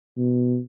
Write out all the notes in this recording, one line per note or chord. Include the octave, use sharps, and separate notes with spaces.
B2